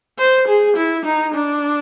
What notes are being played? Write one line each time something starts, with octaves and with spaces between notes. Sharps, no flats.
C5
G#4
E4
D#4
D4